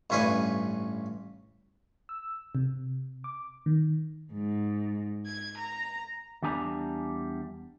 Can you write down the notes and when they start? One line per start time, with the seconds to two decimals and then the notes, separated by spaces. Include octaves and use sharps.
0.10 A1 G2 C#4 B4 G#5 C6
2.09 E6
2.55 C3
3.24 D6
3.66 D#3
4.32 G#2
5.25 G#6
5.58 A#5
6.42 E2 G3 D4 G#5 A#5